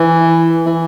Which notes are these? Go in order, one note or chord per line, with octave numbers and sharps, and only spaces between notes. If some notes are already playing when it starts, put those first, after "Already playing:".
Already playing: E3
E3